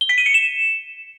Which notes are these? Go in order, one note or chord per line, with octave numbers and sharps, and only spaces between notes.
G7
B6
D#7
C#7
E7